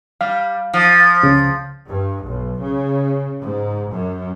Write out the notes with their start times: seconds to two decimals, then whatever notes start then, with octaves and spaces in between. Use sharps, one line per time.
0.21 G3 F5
0.74 F3
1.23 C#2 C#3
1.87 G2
2.24 B1
2.61 C#3
3.42 G#2
3.91 F#2